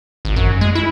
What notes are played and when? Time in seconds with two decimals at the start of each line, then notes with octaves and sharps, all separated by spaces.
0.25 G#1
0.36 F#2
0.61 G#3
0.75 E4